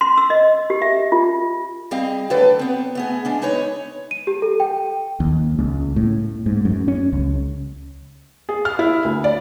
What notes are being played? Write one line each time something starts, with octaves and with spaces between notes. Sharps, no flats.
C6
E6
D#5
G4
E5
F4
G3 C4 G#4 D#5 F5
D3 F#3 A3 A4 B4 D5
B3 C4
A3 B3 G#4
G#3 C#4 D4
G#3 D#4 B4 C#5
D#7
G4
A4
G5
D#2
C#2
A2
G#2
F#2
C#4
C#2
G#4
F6
E4
D2
D5